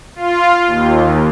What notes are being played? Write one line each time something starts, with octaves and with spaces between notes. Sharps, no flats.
F4
D#2